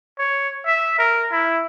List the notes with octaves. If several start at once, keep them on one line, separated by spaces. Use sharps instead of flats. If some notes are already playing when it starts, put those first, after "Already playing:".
C#5
E5
A#4
E4